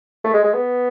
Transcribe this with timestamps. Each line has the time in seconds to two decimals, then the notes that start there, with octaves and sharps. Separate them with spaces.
0.24 A3
0.34 G#3
0.44 G#3
0.54 B3